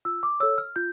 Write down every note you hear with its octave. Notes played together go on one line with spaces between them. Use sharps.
F4 E6
D6
A4 C#5 E6
F6
F4 G6